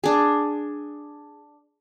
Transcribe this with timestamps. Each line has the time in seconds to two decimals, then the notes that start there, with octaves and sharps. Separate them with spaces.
0.04 D4 G#4